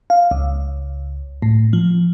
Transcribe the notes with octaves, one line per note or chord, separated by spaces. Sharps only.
F5
C#2
A2
F3